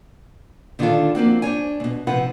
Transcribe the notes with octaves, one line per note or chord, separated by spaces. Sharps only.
D3 D#3 B3 D4 F4 A4
F3 A#3 C4 F#4
D4 C5 C#5 G#5
D2 B2
C3 F3 D#4 B4 F#5